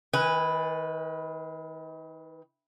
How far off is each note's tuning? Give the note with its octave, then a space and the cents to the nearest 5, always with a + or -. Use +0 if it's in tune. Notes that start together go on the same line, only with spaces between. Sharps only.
D#3 +40 B4 +0 G#5 -20